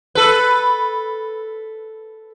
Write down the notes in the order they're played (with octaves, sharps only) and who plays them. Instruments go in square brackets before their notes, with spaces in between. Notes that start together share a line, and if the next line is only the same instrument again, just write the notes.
[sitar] A4 B4